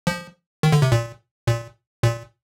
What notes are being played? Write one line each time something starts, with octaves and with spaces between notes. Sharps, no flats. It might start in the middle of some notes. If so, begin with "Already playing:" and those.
F3
D#3
D3
C3
A#2
A#2
A#2